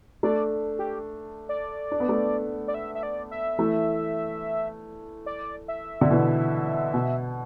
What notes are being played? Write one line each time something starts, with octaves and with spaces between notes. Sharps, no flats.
A3 D4 D5
G4
D5
D4
B3
A3 D4
D5
E5
E5
D5
E5
E3 A3
D5
E5
D3
B2 E3
B2